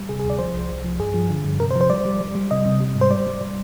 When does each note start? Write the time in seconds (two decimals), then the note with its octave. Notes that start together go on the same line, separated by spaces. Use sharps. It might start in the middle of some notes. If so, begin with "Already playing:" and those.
Already playing: G3
0.09 C3 G#4
0.20 G#4
0.24 D2
0.30 D5
0.39 F3 C5
0.54 C2
0.69 C2
0.85 F3
0.99 G2 G#4
1.14 F3
1.30 D3
1.45 G2
1.60 C3 A#4
1.71 C5
1.76 F3
1.81 C5
1.90 G3 D5
2.05 G3
2.21 G3
2.35 G3
2.51 C3 D#5
2.66 C3
2.80 G3
2.96 G#2
3.01 C5
3.11 G3 D5
3.27 G3
3.41 G3